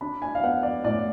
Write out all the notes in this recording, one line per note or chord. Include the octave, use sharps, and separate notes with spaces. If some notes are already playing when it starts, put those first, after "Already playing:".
D4 B5
G#5
F5
B3 F#5
D5
A2 D5